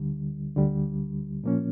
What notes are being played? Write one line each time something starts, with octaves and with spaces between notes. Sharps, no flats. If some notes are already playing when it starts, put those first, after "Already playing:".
Already playing: D2 D3 G3
D2 D3 G3
A#2 F3 A#3 C#4